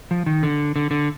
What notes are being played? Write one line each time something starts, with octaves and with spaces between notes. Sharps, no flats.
F3
D#3
D3
D3
D3